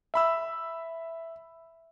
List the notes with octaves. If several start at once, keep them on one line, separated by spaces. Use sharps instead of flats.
E5 B5 E6